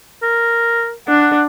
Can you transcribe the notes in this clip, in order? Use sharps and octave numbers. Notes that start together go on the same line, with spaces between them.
A#4
D4 F#5